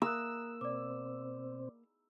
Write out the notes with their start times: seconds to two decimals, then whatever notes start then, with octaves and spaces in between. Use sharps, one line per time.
0.02 A#3 A#5 D#6 E6 F#6
0.61 B2 C4 C5 D5 D6